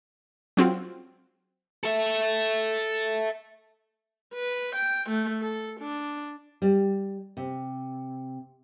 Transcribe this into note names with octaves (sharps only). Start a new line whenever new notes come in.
F#3 C4 F4 F#4
A4 E5
B4
G5
A3
A4
D4
G3
C3